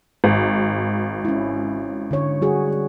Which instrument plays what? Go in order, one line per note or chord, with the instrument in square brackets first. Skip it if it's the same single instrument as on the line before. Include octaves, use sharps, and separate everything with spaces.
[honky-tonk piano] G#1
[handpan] C#4 E4
D3 C#5
G3 F#4 G#4